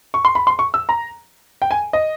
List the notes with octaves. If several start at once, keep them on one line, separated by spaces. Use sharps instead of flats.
C#6
C6
B5
C6
C#6
E6
A#5
G5
G#5
D#5